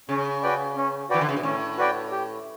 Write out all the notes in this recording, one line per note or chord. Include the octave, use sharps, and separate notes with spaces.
C#3 C#4
F#4 B4 D5 G5
C#4
E3 F#4 B4 D5 G5
D3
C#3
B2
A2 C#4
F#4 B4 D5 G5
G4